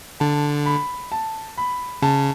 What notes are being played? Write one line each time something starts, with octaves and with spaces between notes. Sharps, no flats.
D3 A5
B5
A5
B5
C#3 A5